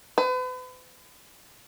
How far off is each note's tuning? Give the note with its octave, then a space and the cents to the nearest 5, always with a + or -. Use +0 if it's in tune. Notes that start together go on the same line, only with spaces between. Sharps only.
B4 +40